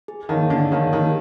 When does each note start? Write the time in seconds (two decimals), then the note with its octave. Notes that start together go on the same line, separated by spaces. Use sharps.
0.08 G#4
0.29 D#3 C#5 F5 A5
0.50 D3 G#4
0.72 D#3 C#5 F5 A5
0.92 D#3 G4